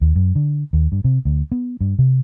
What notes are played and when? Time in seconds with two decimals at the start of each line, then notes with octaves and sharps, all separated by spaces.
0.01 D#2
0.16 F#2
0.35 D3
0.73 D#2
0.92 G2
1.04 C3
1.25 D2
1.52 B3
1.81 G2
1.99 C3